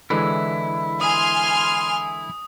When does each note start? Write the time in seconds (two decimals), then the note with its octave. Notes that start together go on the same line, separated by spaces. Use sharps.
0.10 D3 E3 G#3 E4
1.01 G#5 C6 D#6 F6